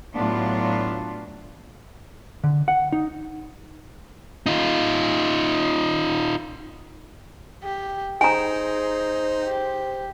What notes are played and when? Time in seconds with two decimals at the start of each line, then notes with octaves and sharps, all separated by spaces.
0.15 A2 F#3 B3 D4 F4
2.44 D3
2.68 F#5
2.92 D#4
4.46 D#4 F4
7.64 G4
8.21 D#4 G#4 C5 G#5 A#5
9.44 G4